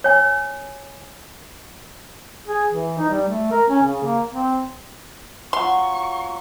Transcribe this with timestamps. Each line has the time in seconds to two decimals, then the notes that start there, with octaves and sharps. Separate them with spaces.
0.04 C#5 G#5
2.47 G#4
2.70 E3
2.98 D#4
3.10 G3
3.28 A3
3.51 A#4
3.69 C#4
3.83 C#3
4.04 A#3
4.31 C4
5.53 F#3 F4 C6 C#6